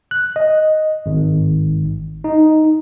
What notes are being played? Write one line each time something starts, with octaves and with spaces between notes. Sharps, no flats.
F#6
D#5
G#1
D#4